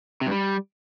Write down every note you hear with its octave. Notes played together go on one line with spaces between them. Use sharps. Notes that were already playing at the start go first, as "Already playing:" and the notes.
C3
G2
G3